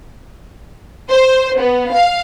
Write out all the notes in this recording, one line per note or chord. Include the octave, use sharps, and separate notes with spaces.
C5
B3
F5